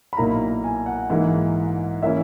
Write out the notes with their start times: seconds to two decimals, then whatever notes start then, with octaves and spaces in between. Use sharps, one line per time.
0.13 B5
0.17 B1 A#2 A#3 E4 A#5
0.64 G#5
0.86 F#5
1.10 G#2 E3 A#3
2.03 E3 A#3 C#4 E4 E5